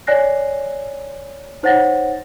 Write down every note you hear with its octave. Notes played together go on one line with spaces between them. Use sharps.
C#5 D5 G#5 F#6 A#6 C7
D#4 C5 C#5 F#5 A6 A#6